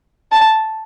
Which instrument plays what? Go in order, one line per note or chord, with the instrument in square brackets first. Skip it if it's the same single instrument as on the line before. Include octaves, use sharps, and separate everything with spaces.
[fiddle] A5